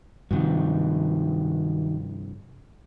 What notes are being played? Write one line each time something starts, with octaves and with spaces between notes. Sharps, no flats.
G2 C3 D#3 F3 F#3